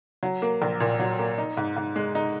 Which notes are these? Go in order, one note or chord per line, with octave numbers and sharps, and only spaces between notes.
F#3
A#3
A#1
A#2
F#3
A#3
D#4
G#2
G#2
G#3
D#4